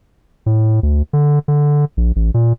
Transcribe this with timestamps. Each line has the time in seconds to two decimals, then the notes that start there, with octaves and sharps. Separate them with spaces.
0.46 A2
0.83 D2
1.13 D3
1.48 D3
1.97 A#1
2.16 A1
2.34 A#2